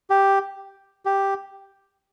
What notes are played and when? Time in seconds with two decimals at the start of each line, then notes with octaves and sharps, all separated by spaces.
0.10 G4
1.06 G4